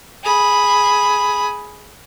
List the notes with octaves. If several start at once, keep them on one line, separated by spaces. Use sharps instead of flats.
G#4 B5